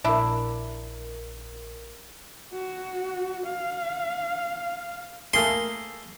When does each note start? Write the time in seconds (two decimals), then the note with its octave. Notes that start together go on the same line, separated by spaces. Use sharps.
0.04 A#1 D4 E4 A#4
2.53 F#4
3.46 F5
5.34 A3 A#3 G#4 C6